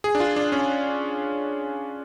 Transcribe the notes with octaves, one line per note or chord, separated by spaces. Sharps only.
G#4
D4
F4
D4
C#4